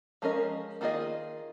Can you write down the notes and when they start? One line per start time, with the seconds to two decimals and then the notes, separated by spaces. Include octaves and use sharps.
0.22 F3 G#3 C#4 A#4 D#5
0.81 D#3 A#3 F4 G#4 D#5